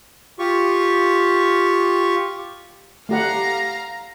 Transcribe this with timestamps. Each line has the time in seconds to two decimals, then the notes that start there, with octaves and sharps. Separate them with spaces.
0.39 F4 G4 C#6
3.09 A3 G4 F5 F#5 A#5